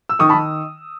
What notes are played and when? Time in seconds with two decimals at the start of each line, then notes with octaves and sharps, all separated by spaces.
0.09 E6
0.19 D#3 C#6 D#6
0.29 A5 B5
0.34 D#3